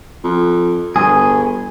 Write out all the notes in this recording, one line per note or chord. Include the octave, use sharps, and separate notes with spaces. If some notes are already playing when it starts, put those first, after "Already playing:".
F2
G1 G#4